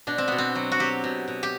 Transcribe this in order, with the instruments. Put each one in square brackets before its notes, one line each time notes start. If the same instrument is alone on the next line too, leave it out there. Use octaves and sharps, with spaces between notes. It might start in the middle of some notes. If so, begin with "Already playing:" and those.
[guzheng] B2 D4
C4
B2 B3
C4
F#3
F#4
F#3 G4
B2
B2
G4